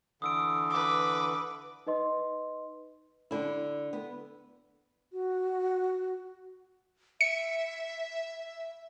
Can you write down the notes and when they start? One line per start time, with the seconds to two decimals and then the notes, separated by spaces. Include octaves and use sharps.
0.22 D3 E3 D#6 E6 D7
0.70 B4 D6
1.87 D#4 B4 D#5 C6
3.31 D3 E4
3.93 B3
5.13 F#4
7.21 E5 C#7